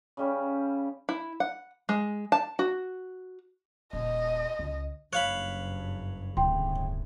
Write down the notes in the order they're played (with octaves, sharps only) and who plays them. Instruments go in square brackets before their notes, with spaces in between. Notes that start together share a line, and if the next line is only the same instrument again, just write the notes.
[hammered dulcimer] C#3 G3 C#4
[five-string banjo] E4
F#5
G#3
A5
F#4
[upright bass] D#1 [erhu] D#5
[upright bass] C#2
[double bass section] F#1 G2 [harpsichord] C#5 F5 B5 [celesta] F#6
[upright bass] D1 [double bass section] G1 C#3 E3 [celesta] G5 C6